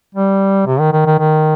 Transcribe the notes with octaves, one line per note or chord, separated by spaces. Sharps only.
G3
C3
D#3
D#3
D#3
D#3